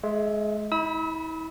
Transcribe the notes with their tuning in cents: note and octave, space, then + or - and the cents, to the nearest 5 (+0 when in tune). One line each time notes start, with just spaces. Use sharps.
G#3 +25 E5 +0
E4 -45 B5 +0 E6 -40